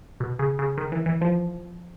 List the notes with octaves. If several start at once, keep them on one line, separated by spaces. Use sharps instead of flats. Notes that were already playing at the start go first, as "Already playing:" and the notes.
B2
C#3
C#3
D#3
E3
E3
F3